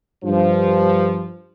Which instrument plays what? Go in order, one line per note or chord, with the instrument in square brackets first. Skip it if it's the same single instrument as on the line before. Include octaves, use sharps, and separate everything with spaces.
[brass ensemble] G2 F3